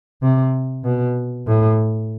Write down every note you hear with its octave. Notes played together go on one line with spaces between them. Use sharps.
C3
B2
A2